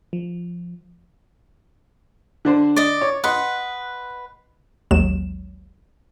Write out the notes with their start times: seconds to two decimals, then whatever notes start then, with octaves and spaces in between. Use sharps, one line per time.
0.13 F3
2.45 D3 D4 C5
2.76 D5 D#5
3.01 C#5
3.24 B4 D#5 F#5 C6
4.91 A1 D#2 F#3 G#3 E7